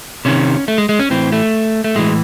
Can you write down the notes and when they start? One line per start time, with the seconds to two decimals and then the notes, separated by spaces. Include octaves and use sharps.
0.25 C3 D#3 C#4
0.68 A3
0.78 G#3
0.89 G#3
0.99 C#4
1.10 A2 E3 C4
1.32 A3
1.84 A3
1.95 A2 E3 G#3